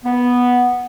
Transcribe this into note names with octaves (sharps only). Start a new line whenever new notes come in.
B3